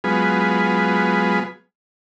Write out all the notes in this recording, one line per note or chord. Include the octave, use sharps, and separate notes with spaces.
F#3 G#3 B3 F4 G#4 B4